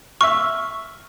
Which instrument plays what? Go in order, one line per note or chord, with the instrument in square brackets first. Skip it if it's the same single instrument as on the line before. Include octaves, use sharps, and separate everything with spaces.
[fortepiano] E5 F6 [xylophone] C#6